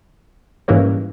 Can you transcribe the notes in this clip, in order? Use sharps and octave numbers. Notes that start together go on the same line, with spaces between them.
G#2 E3 G3 A#3 C#4